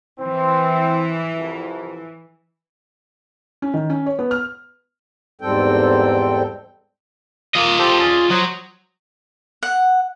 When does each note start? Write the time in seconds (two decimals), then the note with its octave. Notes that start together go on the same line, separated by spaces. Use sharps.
0.20 E3 C4
1.37 C2 F2
3.62 C#4
3.74 D#3
3.90 C#4
4.06 C#5
4.19 B3
4.31 F6
5.41 E2 G#2 G3 C4 A4 G5
7.55 A#3 F4 D#5
7.78 G4 A4 C5
7.99 C#4 G#4 D5
8.30 F#3 C5 F#5 D#6
9.63 F#5